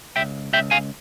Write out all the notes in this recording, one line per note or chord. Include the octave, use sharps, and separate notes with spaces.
C#2 E5 G5
C#2 E5 G5
F5 G#5